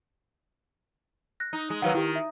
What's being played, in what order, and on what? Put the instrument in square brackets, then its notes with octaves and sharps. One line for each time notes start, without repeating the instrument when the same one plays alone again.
[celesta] F#6 A#6
[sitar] D#4
G#3
[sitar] D#3 F#3 [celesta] B4 F5 F#5
[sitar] D#3 [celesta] E4 G4
[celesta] E5